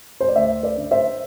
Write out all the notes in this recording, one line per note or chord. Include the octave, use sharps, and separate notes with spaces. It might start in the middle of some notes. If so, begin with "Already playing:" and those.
C5
D5
D2 C5 E5
B4 D5
D3
C5 E5